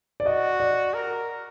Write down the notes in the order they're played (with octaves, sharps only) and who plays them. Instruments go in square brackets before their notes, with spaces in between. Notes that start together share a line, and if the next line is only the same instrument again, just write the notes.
[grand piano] D5
[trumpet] F#4 [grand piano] D#5
[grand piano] D5
[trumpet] A#4